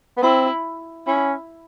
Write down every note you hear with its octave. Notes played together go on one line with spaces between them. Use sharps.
B3
C4 E4
C#4 E4